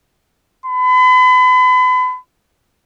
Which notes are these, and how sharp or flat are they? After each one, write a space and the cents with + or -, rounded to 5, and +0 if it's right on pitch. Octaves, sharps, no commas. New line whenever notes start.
B5 +40